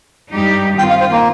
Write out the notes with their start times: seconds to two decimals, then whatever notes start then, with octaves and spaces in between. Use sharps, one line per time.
0.33 G2 G3 D#4 G4
0.78 D#3 C4 F4 G5
0.90 F5
1.00 C5
1.12 A#3